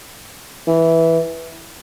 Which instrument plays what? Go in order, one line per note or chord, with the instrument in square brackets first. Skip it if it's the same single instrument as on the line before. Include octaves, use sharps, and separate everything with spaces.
[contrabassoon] E3